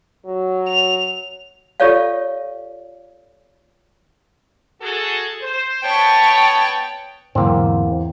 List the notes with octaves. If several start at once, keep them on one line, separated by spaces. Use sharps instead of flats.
F#3
F7
F4 G4 A4 C#5 D5 F5
F#4 G#4 A4
C5
B3 C#5 G5 A5
E2 G#2 D3 F#3 A#3 C4